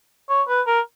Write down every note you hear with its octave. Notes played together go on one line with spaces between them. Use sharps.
C#5
B4
A#4